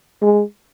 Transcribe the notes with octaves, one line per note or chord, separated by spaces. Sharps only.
G#3